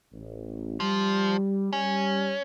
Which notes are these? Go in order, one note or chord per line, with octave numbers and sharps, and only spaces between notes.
A1
F3 G3
G3 C#4